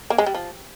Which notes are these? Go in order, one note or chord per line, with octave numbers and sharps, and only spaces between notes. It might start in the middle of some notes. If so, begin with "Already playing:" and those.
A#3
G#3
G3
F3